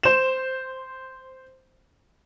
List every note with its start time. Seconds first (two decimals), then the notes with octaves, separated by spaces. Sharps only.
0.03 C5 E7